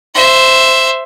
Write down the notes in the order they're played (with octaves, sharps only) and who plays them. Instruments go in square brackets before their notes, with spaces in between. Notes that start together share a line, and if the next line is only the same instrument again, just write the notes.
[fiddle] C5 E5